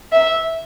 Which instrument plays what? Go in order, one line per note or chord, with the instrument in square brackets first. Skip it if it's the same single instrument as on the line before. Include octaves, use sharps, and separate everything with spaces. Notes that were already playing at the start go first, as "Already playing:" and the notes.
[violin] E5